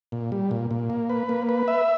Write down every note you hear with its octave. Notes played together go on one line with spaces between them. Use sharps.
A#2
G3
A#2
A#2
A#3
B4
A#3
B4
E5